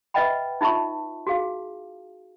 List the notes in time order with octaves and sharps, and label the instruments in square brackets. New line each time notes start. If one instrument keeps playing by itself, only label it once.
[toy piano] B4 D#5 E5 F#5 G5 B5
D#4 F4 E5 A5 C#6
F#4 G#4 F5